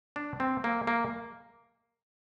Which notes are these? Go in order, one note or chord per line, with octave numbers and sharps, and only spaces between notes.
D4
C4
A#3
A#3